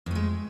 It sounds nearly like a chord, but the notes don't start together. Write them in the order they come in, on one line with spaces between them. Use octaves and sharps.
F2 A3 G#3